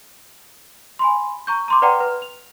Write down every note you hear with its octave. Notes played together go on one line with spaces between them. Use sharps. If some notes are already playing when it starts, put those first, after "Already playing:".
G#5 B5 C6
A#5 C#6 G6
A#5 C6 D6
B4 D5 F#5 G5 A#5 C6
B4
F7